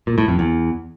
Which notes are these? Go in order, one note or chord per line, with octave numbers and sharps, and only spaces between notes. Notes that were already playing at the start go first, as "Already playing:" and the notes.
A#2
A2
F2
E2